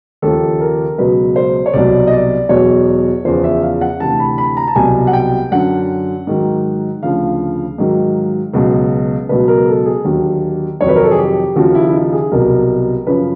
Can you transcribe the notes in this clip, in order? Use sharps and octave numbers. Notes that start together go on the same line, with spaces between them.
D#2 C#3 F3 A4
A#4
C#2 B2 F#3 B4
C5
C#5
C2 B2 F#3 D5
D#5
D5
E2 B2 F#3 C#5
E2 C#3 F3 C5
E5
F5
F#5
D2 C3 E3 A5
B5
B5
A#5
A5
C2 B2 F#3 G#5
F#5
G5
F#2 D3 F#3 F#5
G#2 D#3 F#3
D2 C#3 F3 F5
G#2 D#3 F#3
C#2 B2 F#3
C#2 B2 F#3 B4
A#4
A4
G#4
D#2 D3 F#3
F2 C3 D#3 F#3 C#5
B4
A#4
A4
G#4
G4
D#2 C#3 F3 F#4
E4
E4
D#4
G#4
C2 B2 F#3 A#4
F#2 C#3 F3 B4